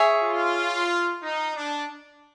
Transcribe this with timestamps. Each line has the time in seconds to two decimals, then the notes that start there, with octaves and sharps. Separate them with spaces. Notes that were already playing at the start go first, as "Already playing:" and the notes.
Already playing: G#4 C#5 E5
0.23 F4
1.23 D#4
1.56 D4